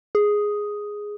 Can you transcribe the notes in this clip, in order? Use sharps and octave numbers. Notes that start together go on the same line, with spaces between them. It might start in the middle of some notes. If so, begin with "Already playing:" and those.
G#4